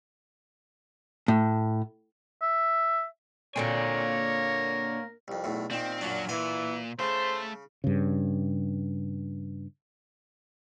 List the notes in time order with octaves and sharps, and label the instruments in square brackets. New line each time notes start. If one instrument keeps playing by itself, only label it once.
[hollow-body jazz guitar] A2
[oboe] E5
[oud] A#2 D3 C4 [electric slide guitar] A#3 G#5 [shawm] A#4 [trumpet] C#5
[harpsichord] C2 F2
B1 E2 A2
[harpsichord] A#2 D#3 [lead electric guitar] C4
[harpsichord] F#2 A#2 D4 [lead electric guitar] F#3
[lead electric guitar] A#2 [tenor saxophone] E3 [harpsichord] G#5
[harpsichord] C#3 [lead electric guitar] A3 A4 [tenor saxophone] C5
[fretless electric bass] G2 C#3